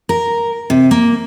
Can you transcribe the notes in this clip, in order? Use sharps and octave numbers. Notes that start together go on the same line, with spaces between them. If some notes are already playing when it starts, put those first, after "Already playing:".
A#4
C3
A#3